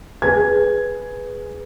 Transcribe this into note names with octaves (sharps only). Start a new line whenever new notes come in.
G#4 B4 G#6